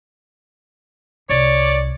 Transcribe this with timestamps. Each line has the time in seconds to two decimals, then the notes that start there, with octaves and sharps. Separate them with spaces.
1.29 C2 C#5 D5